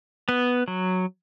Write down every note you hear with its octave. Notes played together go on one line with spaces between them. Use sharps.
B3
F#3